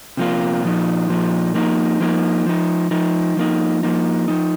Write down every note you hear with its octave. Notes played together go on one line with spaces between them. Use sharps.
C3 F3 A#3 F4
A#2 F3 D#4
A#2 F3 D#4
F3 A#3 D#4
F3 A#3 D#4
F3 D#4
F3 D#4
F3 A#3 D#4
F3 A#3 D#4
F3 D#4